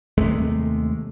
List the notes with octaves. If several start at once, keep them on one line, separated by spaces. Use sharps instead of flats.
D#2 C3 G#3 A3